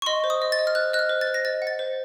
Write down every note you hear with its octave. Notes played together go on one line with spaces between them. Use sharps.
C#6
D#5 C6
C5
D#6
D#5
A6
D#5
F6
C5 F#6
D#5 F#6
F6
C5
A6
C5
A#6
D#5 A6
F#5
A6
C5